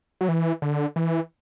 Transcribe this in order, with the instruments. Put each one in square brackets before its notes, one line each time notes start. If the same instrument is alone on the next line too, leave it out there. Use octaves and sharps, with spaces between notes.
[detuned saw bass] F#3
E3
D3
E3